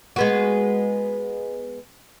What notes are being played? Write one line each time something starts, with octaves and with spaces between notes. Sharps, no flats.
G#3 B3 F#4